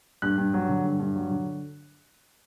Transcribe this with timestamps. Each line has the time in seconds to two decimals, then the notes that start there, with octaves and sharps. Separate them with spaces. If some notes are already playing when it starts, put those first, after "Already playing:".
0.22 G2 F#6
0.38 G2
0.54 F#3
0.69 D3
0.84 G2
0.99 G2
1.16 F#3
1.31 D3